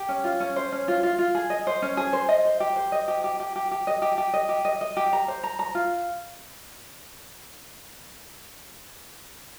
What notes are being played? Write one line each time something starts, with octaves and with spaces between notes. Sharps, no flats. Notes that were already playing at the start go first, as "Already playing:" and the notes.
Already playing: G4
C#4
F4
C#4
C5
C#4
F4
F4
F4
G#4
D#5
C5
C#4
G#4
C5
D#5
C5
G4
C5
D#5
G4
G4
G4
G4
G4
D#5
G4
G4
D#5
G4
D#5
D#5
G4
A#5
C5
A#5
A#5
F4